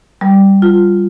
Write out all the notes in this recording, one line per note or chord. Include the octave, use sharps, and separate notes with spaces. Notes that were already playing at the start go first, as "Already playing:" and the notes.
G3
F4